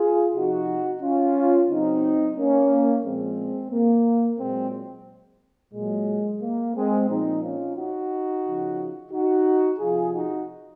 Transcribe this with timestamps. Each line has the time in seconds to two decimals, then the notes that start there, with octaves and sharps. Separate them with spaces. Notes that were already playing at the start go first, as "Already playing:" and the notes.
Already playing: F4 G#4
0.34 C3 F3 D#4 F#4
1.02 C#4 F4
1.69 C#3 F#3 C4 D#4
2.37 A#3 C#4
3.05 A#2 F3 G#3 C4
3.72 A#3
4.39 A#2 F#3 G#3 C4
5.74 A#2 F#3 G#3
6.41 A#3
6.75 G#3 C4
7.09 A#2 F3 C4 D#4
7.43 C#4 F4
7.76 D#4 F#4
8.44 C#3 F3
9.11 D#4 F#4
9.79 C3 F3 F4 G#4
10.13 D#4 F#4